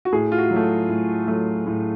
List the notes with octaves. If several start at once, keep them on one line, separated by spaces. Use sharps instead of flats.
F#4
A2 G#4
F4
F#4
F#3
A3
A2
F#3 A3
A2